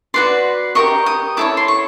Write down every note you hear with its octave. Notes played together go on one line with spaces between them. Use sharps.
F#4 B4 D5 C6
G4 A#4 D#5 C#6
D#6
E4 A4 C#5 D6
C6
C#6